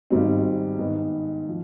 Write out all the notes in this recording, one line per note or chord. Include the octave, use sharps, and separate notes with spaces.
G#1 G#2 G3 C4
G#2 D#3 B3 D#4
F3